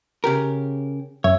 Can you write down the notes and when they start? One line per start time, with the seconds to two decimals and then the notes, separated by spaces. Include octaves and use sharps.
0.24 C#3 G4 A#4
1.24 F#2 C#5 E5